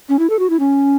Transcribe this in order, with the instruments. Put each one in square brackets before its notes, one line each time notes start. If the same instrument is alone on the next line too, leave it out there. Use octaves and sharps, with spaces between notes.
[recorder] C#4
E4
A4
F#4
E4
C#4